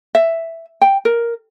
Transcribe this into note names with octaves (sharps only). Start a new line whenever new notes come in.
E5
G5
A#4